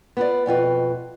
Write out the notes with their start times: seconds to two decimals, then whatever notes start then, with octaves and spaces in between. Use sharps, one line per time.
0.17 B3 F4 D5
0.46 F2 B2 F4 B4